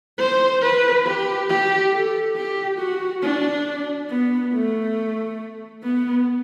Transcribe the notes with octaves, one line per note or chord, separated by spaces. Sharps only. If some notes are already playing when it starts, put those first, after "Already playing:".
C5
B4
G4
G4
A4
G4
F#4
D4
B3
A3
B3